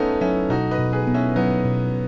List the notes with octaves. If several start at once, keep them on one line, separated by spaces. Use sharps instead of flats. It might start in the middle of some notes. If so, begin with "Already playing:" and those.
Already playing: A3 B3 C#4 D#4 A4
F#3 C#4 E4
B2 D#4 F#4
B4 D#5
B2
G#4 B4
B3
C#4 E4
F#3 B3 D#4
B2